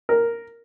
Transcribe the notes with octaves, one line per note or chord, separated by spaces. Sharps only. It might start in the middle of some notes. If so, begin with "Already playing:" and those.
A#4